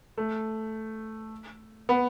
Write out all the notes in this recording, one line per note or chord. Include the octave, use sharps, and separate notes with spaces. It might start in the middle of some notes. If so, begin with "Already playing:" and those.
A3
B3